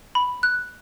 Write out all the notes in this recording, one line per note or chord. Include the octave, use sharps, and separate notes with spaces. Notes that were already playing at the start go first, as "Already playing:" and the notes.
B5
F#6